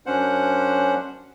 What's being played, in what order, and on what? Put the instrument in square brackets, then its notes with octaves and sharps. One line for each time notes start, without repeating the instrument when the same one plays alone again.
[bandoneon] F#2 C#4 D4 C5 F#5